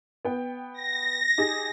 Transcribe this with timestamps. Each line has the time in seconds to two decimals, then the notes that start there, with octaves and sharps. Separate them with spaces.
0.25 B3 G5
0.73 A#6
1.38 D#4 G4 G#4